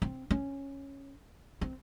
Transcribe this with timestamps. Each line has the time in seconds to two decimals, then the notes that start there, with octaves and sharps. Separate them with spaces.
0.02 C4
0.31 C#4
1.61 C4